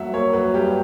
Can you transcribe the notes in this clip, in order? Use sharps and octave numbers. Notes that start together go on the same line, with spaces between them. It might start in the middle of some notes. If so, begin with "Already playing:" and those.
Already playing: G2 F#3 A#3 E5 F#5
A#3 C#5
F#3 B4
G2 G4